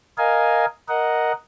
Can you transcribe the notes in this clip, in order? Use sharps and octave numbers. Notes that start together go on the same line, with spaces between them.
A#4 D#5 F5 G#5
A#4 D#5 F#5